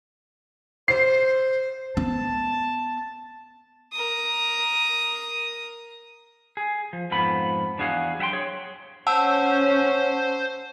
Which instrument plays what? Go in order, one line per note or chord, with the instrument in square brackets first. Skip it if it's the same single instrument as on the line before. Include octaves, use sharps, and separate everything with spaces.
[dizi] C5 [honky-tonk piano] C7
[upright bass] B3 [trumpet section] A5
[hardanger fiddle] A#4 D#6
[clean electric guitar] G#4
F3
F2 G#2 F3 B3 B5
E2 D4 F#4 G#4 F5 F#5
F#3 E5 F#5 G5 C6
G#4 C#5
[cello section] C#4 [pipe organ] C5 [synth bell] F#5 A5 E6